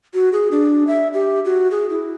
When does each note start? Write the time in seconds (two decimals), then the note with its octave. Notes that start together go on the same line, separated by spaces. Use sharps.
0.14 F#4
0.33 G#4
0.51 D4
0.87 E5
1.13 G4
1.45 F#4
1.71 G#4
1.90 E4